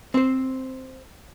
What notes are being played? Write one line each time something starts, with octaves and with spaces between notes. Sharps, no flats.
C4 C5